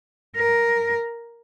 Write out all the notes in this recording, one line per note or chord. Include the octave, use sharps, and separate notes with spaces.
A#4